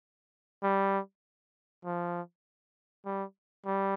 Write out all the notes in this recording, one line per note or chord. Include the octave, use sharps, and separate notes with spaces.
G3
F3
G3
G3